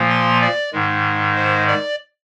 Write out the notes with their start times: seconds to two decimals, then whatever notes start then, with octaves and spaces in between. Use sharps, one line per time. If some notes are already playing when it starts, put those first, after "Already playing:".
Already playing: A#2 F3 A#3
0.10 C6
0.41 D5
0.72 G#2 D#3 G#3
1.36 C5
1.67 D5